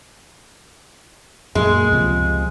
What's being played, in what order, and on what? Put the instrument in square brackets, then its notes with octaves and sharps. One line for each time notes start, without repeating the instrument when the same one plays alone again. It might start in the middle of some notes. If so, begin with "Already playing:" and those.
[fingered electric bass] F#2 A#2 [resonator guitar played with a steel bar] G#3
[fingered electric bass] C#2 C3 F3